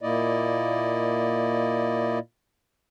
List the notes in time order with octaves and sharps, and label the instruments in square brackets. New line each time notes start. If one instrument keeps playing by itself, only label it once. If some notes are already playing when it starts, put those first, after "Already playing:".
[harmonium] A#2 A#3 E4 D5 D#5